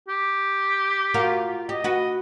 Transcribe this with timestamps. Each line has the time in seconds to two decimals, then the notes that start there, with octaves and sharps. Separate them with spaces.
0.08 G4
1.14 F4 F#4 A#4
1.69 G4 D#5
1.84 F#4 B4